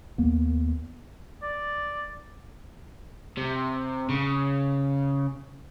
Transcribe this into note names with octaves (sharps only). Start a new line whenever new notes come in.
D#2 A#3 B3
D5
C3
C#3